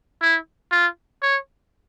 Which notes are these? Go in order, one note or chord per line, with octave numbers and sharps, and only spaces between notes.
E4
F4
C#5